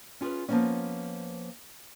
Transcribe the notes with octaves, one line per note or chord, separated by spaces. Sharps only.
C#4 F4 G4 G#4 B4
F3 G#3 A#3 B3 C#4